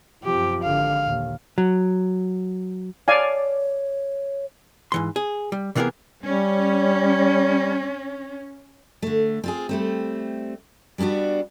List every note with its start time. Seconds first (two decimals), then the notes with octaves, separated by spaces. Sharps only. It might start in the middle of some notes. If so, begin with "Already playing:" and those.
0.24 F#2 C3 F3 G4
0.64 G#1 D3 F5
1.05 D#2 A#2
1.58 F#3
3.08 C#5 D5 F5 G#5
4.92 G#2 E3 C6
5.16 G#4
5.52 G3
5.75 C3 E3 A#3 B3 G#4 A#4
6.23 G3 C#4
9.02 D3 A3
9.44 C4 F4 G#4
9.69 G3 A3 C4
10.98 G3 B3 C#4 D4 F#4